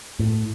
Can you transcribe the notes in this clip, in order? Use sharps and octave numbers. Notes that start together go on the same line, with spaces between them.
A2